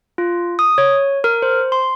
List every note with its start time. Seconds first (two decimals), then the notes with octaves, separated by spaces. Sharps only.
0.18 F4
0.59 D#6
0.78 C#5
1.24 A#4
1.42 C5
1.72 C6